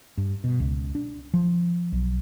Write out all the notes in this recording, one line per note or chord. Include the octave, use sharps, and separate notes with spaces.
G2
B2
C#2
D4
F3
B1